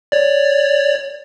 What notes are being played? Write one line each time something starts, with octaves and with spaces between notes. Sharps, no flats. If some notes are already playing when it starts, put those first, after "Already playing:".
C#5 D5